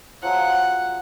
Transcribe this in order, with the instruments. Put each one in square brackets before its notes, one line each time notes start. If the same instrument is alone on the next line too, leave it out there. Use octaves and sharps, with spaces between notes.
[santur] F3 F#3 G#3 [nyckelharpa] F#5